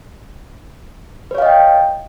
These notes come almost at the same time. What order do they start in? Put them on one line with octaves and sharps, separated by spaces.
B4 C#5 F5 D#5 G5